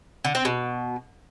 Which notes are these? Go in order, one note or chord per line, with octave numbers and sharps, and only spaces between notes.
D3
C4
B2